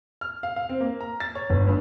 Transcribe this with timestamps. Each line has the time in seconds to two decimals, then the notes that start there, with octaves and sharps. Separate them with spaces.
0.21 F6
0.43 F5
0.56 F5
0.69 C4
0.81 A#3
1.01 A#5
1.20 A6
1.35 C#5
1.50 G1
1.67 G2